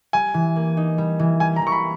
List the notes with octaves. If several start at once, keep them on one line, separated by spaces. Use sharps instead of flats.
G3 G#5
E3
A#3
D#4
G3
E3
G3 G#5
A#5
E3 C#6
B5